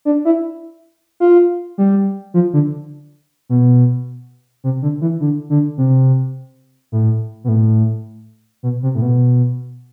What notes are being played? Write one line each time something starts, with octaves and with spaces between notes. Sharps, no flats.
D4
E4
F4
G3
F3
D3
B2
C3
D3
E3
D3
D3
C3
A2
B2
A2
B2
C3
A2
B2